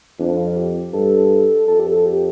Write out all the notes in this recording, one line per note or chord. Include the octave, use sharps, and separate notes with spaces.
F2 D4
F4
G4
G2 A4
F2 A4
G4
A4
G4